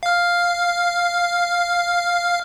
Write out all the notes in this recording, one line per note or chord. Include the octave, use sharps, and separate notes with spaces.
F5 F6